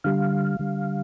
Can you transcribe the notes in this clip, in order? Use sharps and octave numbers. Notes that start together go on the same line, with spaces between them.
D3 G3 F5
D3 G3